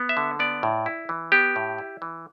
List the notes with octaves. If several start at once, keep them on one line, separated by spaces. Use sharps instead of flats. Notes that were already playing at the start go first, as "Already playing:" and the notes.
Already playing: B3
E5
D3
B3 D5
A2
E4
E3
B3 G4
A2
E4
E3